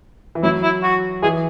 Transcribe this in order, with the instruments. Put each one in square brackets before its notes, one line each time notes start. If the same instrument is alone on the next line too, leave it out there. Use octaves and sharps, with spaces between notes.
[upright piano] E3
[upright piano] F#3 [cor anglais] E4
[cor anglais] E4
F#4
[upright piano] E3 [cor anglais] G#4